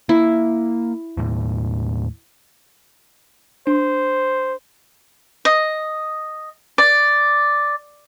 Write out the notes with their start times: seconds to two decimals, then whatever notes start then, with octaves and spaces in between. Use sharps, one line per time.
0.09 A#3 E4
1.17 D#2 A2
3.67 D4 C5
5.45 D#5
6.78 D5